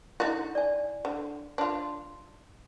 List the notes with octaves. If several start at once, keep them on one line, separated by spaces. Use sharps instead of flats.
D3 D#4 E4 F#4
D5 G#5
D3
D4 F4